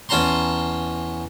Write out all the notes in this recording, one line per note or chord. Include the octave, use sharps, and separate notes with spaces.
E2 C#4 A5 A#5 C6